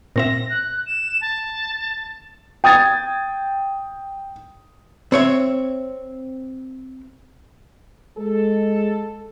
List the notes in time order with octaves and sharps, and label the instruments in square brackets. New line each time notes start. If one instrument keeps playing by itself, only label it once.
[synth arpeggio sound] A#2 C4 E5 [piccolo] A#6
[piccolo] F#6
E7
A5
[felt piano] G5 D#6 G#6 A6
[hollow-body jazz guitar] C4 C#5 E5
[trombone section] G#3 [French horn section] A4